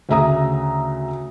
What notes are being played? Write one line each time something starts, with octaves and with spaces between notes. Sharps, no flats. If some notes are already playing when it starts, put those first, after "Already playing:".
D2 C#3 E5 A#5 D#6